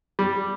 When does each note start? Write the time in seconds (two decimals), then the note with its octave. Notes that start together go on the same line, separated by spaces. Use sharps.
0.19 G3